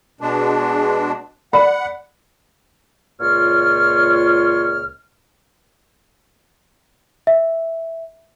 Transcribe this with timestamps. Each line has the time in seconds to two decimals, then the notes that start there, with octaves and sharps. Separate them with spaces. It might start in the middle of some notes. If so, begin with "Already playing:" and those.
0.21 B2 G#3 D4
1.53 D5 F#5 B5
3.20 C#2 A#2 F4 C#5 F6
7.27 E5